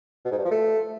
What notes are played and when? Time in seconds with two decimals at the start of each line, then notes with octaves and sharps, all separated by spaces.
0.25 B2
0.31 G#2
0.38 G2
0.44 F3
0.51 A3